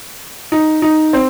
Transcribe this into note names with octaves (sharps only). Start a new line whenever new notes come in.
D#4
D#4
C4